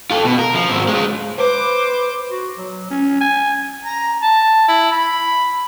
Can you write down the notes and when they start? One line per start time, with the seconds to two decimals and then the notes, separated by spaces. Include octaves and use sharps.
0.10 F4 A4
0.25 B2
0.39 A#4
0.54 F3
0.69 G#2 C4
0.88 G#3 F4
1.37 B4 C5 D6
2.31 F#4
2.58 F#3
2.90 C#4
3.21 G#5
3.83 A#5
4.22 A5
4.68 E4
4.91 B5